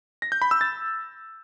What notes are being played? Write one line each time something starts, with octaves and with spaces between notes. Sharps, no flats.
A#6
G6
B5
E6
A6